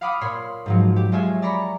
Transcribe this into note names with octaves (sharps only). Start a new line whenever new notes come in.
F5 F#5 B5 D6 D#6 F#6
A#2 C#5 B5 C6
G#2 F3 F#3
G4
G#3 F4 C#5 E5 G#5
D5 A#5 B5 C#6